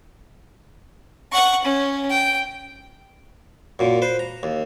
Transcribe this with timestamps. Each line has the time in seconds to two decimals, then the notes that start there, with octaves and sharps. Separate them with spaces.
1.32 F#5 C#6
1.64 C#4
2.10 G5
3.79 F#2 A#2
4.02 B4 C5
4.19 A#5
4.43 D#2